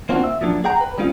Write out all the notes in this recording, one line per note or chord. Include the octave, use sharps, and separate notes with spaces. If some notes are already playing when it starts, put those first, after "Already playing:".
A#3 C4 D4 F4 F#4
E5
F3 F#3 A#3 D4
G#4 F#5 G5 A#5
B4
G3 G#3 C4 C#4 F4